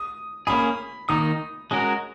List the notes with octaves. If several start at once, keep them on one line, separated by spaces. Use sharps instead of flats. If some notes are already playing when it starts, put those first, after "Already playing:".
Already playing: D#6
A#3 C#4 G#4 B5
D#3 A#3 D#4 D#6
G#3 C#4 F#4 A#4